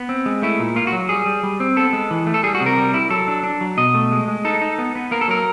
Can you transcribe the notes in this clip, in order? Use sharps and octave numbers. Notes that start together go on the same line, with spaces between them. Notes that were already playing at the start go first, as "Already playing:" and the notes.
Already playing: B3
C4
G#3
A3 E4
A#2
A#3 F4
F#4
F#3
G3 G#4
G3
G3
C4
B3 A4
G#3
E3
A3
A4
G3 G#4
F#4
C3
A#4
G3
E4
F#3 A4
D4
D4
F#3
B2 D#5
A3
G#3
G#3
D#4 A4
D#4
B3
B3
A#3 A#4
A4
F#3 A#4